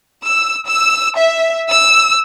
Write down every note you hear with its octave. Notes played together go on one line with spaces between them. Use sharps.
E6
E6
E5
E6